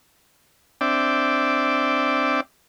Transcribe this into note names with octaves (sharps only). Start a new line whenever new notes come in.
C4 D4 D5 E5 G5